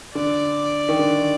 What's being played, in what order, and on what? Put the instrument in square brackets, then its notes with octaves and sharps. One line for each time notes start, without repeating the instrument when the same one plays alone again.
[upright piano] D3 [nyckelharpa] D5
[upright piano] D#3
D3